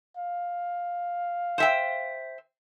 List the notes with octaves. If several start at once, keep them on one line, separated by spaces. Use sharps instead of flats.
F5
C5 E5 G5